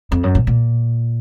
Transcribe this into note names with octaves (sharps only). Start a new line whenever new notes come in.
F2
F#2
A#2
A#2